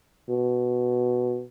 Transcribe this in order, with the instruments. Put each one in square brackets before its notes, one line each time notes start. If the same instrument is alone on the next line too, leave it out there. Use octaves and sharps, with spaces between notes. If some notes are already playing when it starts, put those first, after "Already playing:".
[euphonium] B2